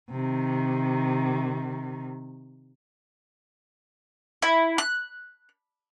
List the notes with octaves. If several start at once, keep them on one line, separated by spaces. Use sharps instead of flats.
C3 D#3
E4
F#6